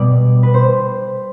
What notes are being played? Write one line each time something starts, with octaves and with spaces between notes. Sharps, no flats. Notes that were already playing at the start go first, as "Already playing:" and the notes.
Already playing: B2 G3 D5
B4
C5